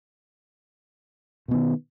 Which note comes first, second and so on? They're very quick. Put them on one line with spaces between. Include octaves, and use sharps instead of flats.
B2 B3 D#3